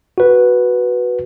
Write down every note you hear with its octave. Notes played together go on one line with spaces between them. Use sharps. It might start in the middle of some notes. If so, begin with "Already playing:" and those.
F#4 B4